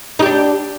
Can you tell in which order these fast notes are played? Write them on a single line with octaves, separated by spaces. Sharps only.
D#4 G4 D4